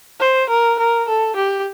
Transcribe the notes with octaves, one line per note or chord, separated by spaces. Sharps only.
C5
A#4
A#4
A4
G4